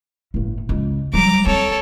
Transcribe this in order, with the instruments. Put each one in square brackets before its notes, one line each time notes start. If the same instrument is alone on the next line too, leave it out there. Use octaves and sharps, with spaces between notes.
[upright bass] G1 A2
C#2
[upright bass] F#3 G3 [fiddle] A#5 D6
[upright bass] C4 [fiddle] A4 C#5